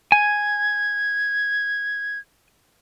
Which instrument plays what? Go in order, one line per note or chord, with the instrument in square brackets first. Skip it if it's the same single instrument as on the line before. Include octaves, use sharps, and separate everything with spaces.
[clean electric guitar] G#5 [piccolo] G#6